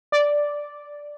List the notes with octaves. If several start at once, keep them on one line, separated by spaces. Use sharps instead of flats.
D5